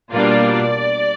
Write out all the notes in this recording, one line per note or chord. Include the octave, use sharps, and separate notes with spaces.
B2 G3 A#3 D4 F4 D5